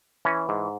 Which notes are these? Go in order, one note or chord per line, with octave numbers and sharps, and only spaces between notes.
E3 C#4
G#2